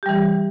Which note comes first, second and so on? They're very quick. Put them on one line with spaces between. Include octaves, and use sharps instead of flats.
G4 G3 E3